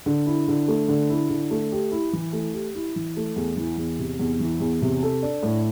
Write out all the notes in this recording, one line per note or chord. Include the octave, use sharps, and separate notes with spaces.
D3
E4
D3
A3
D3
E4
D3
A3
G4
E4
E3
A3
G4
E4
E3
A3
E2
E3
E2
C3
E2
E3
E2
C3
A4
D4
A2